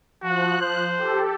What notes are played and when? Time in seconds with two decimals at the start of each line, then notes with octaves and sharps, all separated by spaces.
0.22 F3 F#4 F#6
0.61 C5
0.98 G4 A4